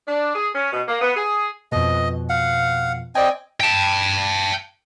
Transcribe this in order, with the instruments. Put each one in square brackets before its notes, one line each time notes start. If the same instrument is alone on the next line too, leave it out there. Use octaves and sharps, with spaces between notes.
[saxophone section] D4
G#4
C#4
B2
A#3
B3
G#4
[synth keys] F2 B2 [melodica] D#5
[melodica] F5 F#5
[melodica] C4 D#5 G5 [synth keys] D5 G#5
[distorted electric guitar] G5 A5